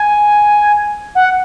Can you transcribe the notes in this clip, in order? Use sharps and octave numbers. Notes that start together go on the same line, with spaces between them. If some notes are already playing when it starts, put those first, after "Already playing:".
Already playing: G#5
F#5